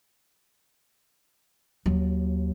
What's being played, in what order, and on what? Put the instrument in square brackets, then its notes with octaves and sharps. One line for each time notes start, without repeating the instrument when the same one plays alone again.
[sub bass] D#2 [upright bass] F#3